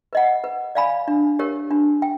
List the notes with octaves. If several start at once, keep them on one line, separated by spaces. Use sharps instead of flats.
B4 D#5 F#5
B4
D5 F5 G#5 B5
D4
G4 A#4 C#5
D4
G5